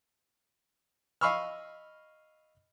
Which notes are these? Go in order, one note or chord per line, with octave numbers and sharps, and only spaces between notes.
D#5 F5 B5 C#6 E6 F6